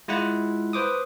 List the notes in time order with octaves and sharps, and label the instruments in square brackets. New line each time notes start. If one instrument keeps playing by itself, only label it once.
[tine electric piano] G#3 E4 F4 F#5
B4 C5 D6 D#6